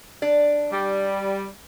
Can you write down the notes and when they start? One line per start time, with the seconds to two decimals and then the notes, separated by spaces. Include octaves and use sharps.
0.22 D4 D5
0.71 G3